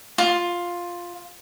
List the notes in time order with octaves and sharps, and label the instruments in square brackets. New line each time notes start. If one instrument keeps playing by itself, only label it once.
[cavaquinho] F4